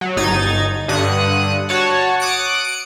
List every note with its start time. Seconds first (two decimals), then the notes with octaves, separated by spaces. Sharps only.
0.01 F#3
0.17 G1 D#4 G#6 A6
0.88 G2 D3 D#6 F#6 C#7
1.69 F#4 C#5 A5
2.20 D6 D#6 F#6 C#7 D7
2.65 C#7 D7